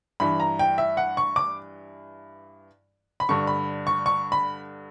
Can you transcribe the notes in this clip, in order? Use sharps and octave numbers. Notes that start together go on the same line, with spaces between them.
G2 E3 B5
A#5
G5
E5
F#5
C#6
D6
B5
G2 D3 C#6
B5
C#6
C#6
B5